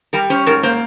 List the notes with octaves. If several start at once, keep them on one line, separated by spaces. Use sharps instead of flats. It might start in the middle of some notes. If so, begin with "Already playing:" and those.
G3 A#4
C#4 C5
G#2 A#4
A#3 C5